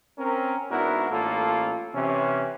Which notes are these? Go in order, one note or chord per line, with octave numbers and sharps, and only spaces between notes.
C4 C#4 A#4
G#2 B3 D4 E4 F#4 A#4
A1 A2 A#3 F4 A4
C3 E3 C#4